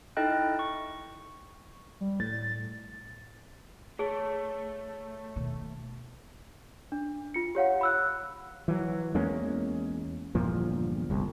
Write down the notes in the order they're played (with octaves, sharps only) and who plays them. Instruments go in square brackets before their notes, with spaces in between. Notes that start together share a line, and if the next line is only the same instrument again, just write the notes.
[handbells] D#4 E4 A4 D#5 G5 F#6
C#6
[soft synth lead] G3
[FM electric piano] A2 [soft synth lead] A6
[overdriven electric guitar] A3 [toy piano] G#4 [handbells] C#5 A5
[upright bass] D#2 B2
[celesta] D4
F4 C#7
G4 C#5 F5 F#5
B5 E6 F#6
[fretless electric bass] E3 F#3
E2 G#3 A#3 C#4
G1 E2 A#2 F3
G1 C2